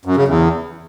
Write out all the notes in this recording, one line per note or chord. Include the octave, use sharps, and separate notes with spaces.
F#2
C#3
E2